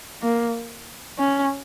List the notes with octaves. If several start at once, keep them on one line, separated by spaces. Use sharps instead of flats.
A#3
C#4